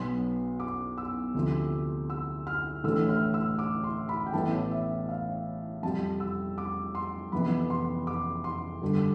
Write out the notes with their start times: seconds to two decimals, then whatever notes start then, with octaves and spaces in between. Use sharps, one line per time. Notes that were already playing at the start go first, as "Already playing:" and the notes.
Already playing: B1 B2 B3 C6
0.60 D6
0.98 E6
1.35 D2 C3 F3
2.10 E6
2.47 F6
2.84 A1 A2 E3 A3 D4 E6
3.09 F6
3.34 E6
3.59 D6
3.84 C6
4.09 B5
4.26 G5
4.33 A1 A2 E3 B3 E4 A5
4.71 E5
5.09 F5
5.83 F2 C3 G3 A5
6.20 E6
6.58 D6
6.95 C6
7.32 F1 F2 E3 B3 B5
7.70 C6
8.07 D6
8.44 C6
8.82 G2 D3 G3 D4